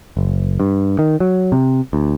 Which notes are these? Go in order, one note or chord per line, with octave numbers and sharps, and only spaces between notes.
F#1
G2
D#3
F#3
C3
D2